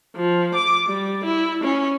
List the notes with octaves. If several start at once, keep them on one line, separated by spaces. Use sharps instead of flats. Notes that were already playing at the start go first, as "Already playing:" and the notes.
F3
D6
G3
E4
C#4